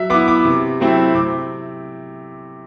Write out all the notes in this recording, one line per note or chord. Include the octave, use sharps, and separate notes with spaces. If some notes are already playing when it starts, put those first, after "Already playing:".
Already playing: F#3 E5
B3 E4 D6
D6
C3
F#3 A3 C4 E4
C3 D6